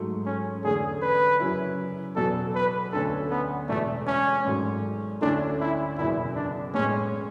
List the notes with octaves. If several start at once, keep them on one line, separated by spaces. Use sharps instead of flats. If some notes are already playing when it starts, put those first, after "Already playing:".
Already playing: G#2 F#3 A3
C#4
E2 D3 A3 C#4 G#4
B4
F#2 C#3 F#3 C#4 E4
E2 B2 F#3 B3 A4
B4
D2 D3 A3 C#4 A4
B3
E1 E2 B2 A3
C#4
G#1 G#2 F#3 A3
D2 D3 A3 C#4 D4 E4
E4
F#1 E2 B2 E4
D4
A1 A2 G#3 B3 C#4